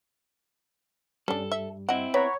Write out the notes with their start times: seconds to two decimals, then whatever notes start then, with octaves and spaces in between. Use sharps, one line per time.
1.28 G2 G3 C#4 D4 A4
1.52 E5
1.89 C4 E4 D#5 F#5
2.14 B3 C#5 F#5 A#5 B5